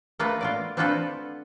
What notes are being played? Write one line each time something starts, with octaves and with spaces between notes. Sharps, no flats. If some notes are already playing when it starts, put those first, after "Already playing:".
A3 A#3 F4 B4
F4 F#4 D5
C4 D4 F4 F#4 A4 B4